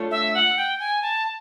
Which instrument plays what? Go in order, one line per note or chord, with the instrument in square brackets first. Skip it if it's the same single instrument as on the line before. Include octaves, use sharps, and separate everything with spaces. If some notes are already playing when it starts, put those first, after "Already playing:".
Already playing: [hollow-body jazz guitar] A3 D4 F4 A4 C#5
[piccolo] E5
F#5
G5
G#5
A5